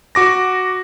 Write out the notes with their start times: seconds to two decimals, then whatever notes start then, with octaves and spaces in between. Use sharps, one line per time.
0.15 F#4 D6 A#6